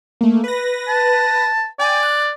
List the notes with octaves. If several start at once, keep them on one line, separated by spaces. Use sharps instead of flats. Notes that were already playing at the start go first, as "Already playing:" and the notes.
A3 A#3
B4 A#6
A5
D5 G5 G#5
F#6